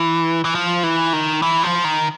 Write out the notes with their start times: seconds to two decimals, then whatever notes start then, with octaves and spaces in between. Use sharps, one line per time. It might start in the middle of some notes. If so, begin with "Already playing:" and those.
Already playing: E3
0.45 E3
0.55 F3
0.83 E3
1.13 D#3
1.42 E3
1.63 F3
1.84 D#3